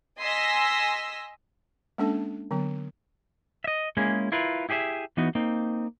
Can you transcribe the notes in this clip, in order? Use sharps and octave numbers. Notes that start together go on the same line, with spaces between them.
D#5 G#5 C6 E6 A#6 B6
G#3 A#3 C#4 D4 A4 A5
D3 F#3 B3
D#5 E5
G#3 A#3 C#4 E4 G#4
E4 F4 A#4 B4
E4 G4 G#4 D5 E5
E3 B3 D#4 F#4
A#3 C4 D#4